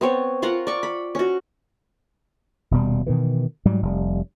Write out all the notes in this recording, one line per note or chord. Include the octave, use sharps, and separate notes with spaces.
B3 C4 C#5
F4 A#4 F5 F#5
D5 C#6
B5
C#4 F#4
D#1 B2 G3
B2 D#3 E3
G#2 F#3 G3
F1 G3